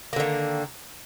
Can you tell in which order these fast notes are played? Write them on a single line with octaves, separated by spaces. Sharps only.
A#3 D3 D#3